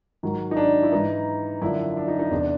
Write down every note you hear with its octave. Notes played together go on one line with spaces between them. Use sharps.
G#2 D#3 F#3
D#4
D4
E4
G#2 E3 D#4
F#2 D3 F3 E4
D4
D#4
D#4
E2 C3 E3 D4